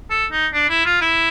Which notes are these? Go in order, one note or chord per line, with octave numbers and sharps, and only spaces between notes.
A4
D#4
D4
E4
F4
E4